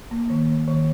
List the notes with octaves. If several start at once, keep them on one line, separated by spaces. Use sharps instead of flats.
A#3
D#3
A#3
D#3